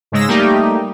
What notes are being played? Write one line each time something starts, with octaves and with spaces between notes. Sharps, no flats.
G#2 C#3 G#3 E6 A#6
G3 A3 A#3 D#4 G4